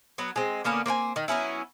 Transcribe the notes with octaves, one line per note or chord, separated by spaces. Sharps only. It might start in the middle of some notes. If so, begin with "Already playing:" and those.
F#3 B3
G#3 C4
D3 A#3 B3 C#4
A#3 C4 G5 G#5
D#3
F#3 B3 C#4 E4